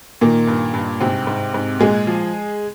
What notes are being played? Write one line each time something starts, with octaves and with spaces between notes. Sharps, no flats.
A#2 D#3 A#3
G2
G2
G#2 C3 C4
G#2
G#2
A#2 G#3 G#4
F3